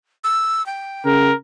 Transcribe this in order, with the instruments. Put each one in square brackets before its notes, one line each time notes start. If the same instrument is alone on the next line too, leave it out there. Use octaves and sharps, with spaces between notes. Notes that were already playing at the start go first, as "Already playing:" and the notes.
[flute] E6
G5
[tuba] C#3 [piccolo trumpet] A#4